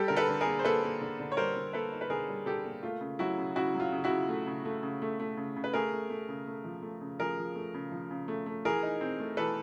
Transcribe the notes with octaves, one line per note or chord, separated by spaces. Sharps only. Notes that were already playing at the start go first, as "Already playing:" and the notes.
Already playing: G3 G4 A4
D3 A#4
A4 B4
D3
G#4 A#4
A#3
C5
A#3 A4 B4
A#3
D3
D3
C#5
G3 A#4 C5
D3
A#3 A4 B4
D#4
B4
D3 G#4 A#4
G3
D3 G4 A4
A#3
A3 F4
C#3
F#3 E4 F#4
C#3
C#3 E4 F#4
F#3
F4
C#3
E4 F#4
C#3
A3
C#3
A3
C#3
A3
A3
C#3
C#3
B4
A3 G#4 A#4
A3
A3
C#3
A3
F3
A3
C#3
F3 G#4 A#4
F3
A3
C#3
F3
C#3
A3
A3
E3 G#4 A#4
D#4
C4
A3
E3 A4 B4